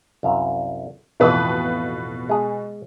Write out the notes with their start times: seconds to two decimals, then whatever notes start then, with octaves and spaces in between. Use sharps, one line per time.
0.23 C2 F#2 F5
1.20 A1 F2 B2 E3 B4 D#6
2.29 G#3 G#4